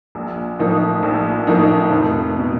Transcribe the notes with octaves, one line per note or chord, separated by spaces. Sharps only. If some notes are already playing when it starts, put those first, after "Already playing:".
A#1
A2 F3 A#3 D#4
A#1
A2 F3 A#3 D#4
F1
B2